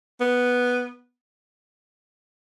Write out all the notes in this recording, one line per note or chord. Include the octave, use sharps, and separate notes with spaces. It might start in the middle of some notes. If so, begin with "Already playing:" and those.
B3